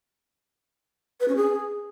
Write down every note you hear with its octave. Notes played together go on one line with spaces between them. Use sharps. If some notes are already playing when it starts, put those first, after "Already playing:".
B4
C#4
G#4